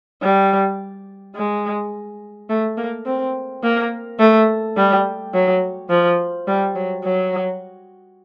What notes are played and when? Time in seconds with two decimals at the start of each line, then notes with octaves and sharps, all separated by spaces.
0.22 G3
1.36 G#3
2.50 A3
2.77 A#3
3.06 C4
3.63 A#3
4.19 A3
4.77 G3
5.34 F#3
5.90 F3
6.47 G3
6.75 F#3
7.04 F#3